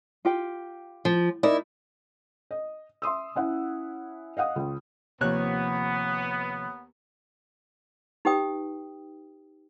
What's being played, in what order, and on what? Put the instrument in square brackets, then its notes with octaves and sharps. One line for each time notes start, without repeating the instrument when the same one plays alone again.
[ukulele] F4 G4 G5
[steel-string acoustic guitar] F3
[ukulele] D#4 A#4 D5 [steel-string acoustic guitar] E4
[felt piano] D#5
E5 C6 D#6 E6
C#4 E4 F#5
D#5 F5 F#5 D#6
C#2
[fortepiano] D#2 C#5 F#6 [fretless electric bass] C3 F3 [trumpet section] B3
[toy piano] D#4 G4 B4 G5 D#6